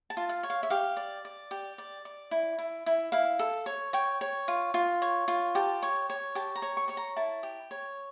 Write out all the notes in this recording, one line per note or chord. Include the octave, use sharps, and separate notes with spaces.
A5
F4
F5
C#5
F5
E5
G4 F5
D5
D5
G4
D5
D5
E4
E4
E4
E4 F5
A4
C#5
C#5 G5
C#5
F4
F4
C#5
F4
G4 A5
C#5
C#5
G4 A5
A#5
C#5
C#6
C#5 C#6
A#5
E4 A5
G4
C#5